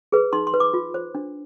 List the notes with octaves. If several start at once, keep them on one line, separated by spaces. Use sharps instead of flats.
G#4 B4
D#4 C6
C6
B4
D6
F4
C5
D4